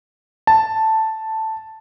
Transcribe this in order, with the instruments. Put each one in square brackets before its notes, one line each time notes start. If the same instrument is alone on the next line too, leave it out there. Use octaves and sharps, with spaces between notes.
[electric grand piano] A5